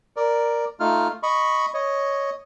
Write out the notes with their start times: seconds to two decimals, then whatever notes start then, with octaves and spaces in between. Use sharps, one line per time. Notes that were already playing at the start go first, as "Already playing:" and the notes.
0.16 A#4 D5
0.80 A3 D#4 F4 F6
1.23 D#5 B5 C#6
1.74 C#5 D#5